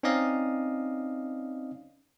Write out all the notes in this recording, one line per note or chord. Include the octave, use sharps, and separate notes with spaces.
C4 C#4 D#4 D5 D#5 F5